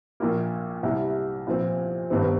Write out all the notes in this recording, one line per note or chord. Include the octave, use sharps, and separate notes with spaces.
A#1 A#2 A#3
C2 C3 G3
A#2 F3 C4
G1 G2 D#3 C4